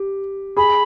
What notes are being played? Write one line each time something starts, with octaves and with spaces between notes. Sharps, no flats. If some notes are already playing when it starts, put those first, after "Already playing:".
Already playing: G4
G#4 B5